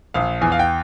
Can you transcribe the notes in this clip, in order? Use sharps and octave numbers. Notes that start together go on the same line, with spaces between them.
A#1 F5
E2 G#5
F5
G5